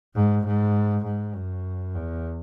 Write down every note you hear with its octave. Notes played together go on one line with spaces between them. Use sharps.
G#2
G#2
G#2
F#2
E2